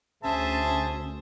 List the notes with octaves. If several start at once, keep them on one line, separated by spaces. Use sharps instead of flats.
D2 C#4 G#4 C5 E5 A5